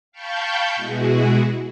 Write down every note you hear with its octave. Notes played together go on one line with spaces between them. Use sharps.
F5 G5 A5 B5 C#6 G6
B2 G#3 E4 F#4 G#4